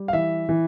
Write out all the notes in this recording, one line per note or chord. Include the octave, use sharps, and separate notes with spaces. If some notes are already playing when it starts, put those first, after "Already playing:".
Already playing: G3
F5
E3 E5
E3